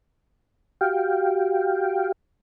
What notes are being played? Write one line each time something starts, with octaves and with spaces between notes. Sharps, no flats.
F#4 G4 F5 G5